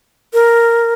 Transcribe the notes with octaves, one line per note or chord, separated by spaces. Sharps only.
A#4